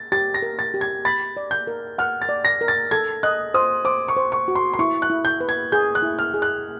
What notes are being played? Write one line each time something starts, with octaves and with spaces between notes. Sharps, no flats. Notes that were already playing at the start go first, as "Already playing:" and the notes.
Already playing: A6
G4 A6
A#6
A#4
A6
G4
G#6
B5 A6
D5
G6
A#4
F#5 F6
A6
D5
A#6
A#4
A6
A4 G#6
D#5 F#6
C5 D#6
C5 D6
C#6
C5
C#6
F#4
C6
C6
E4 C#6
F#6
E4
G6
B4
G#6
G#4 G6
F#6
E4
F6
G#4
F#6